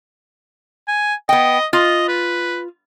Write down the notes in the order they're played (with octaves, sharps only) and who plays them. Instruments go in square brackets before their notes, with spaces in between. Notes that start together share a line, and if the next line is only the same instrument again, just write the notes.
[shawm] G#5
[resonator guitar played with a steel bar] B3 G5 [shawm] D#5
[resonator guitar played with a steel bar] F4 [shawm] D#5
[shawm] B4